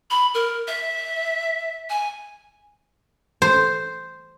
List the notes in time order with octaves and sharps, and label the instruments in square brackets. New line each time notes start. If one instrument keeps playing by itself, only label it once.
[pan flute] B5
A#4
E5
G#5
[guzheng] C5